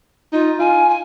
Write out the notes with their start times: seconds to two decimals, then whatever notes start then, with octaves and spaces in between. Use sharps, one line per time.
0.33 D#4 F4
0.59 F4 G#5
0.89 G#5